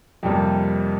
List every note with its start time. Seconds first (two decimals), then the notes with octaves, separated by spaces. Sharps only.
0.23 F2 C3 G3 A#3